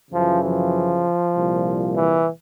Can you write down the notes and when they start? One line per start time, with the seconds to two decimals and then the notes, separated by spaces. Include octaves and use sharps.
0.11 F#2 C#3 E3 F3
0.42 F3
1.34 C2 A#2
1.95 E3